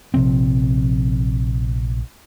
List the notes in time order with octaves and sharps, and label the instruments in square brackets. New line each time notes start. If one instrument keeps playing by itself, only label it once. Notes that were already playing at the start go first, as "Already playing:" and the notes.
[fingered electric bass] A#1 C3 F3 C4